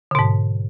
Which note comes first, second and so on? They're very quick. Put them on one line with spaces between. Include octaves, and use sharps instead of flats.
D3 B2 G#2